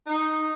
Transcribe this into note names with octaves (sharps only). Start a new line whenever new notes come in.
D#4